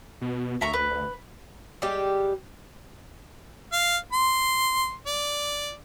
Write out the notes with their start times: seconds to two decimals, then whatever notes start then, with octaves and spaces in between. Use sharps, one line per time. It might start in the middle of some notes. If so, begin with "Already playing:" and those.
0.21 B2
0.61 D2 E5 A#5 C#6
0.73 B4
1.82 G3 G#3 G4
3.73 F5
4.13 C6
5.06 D5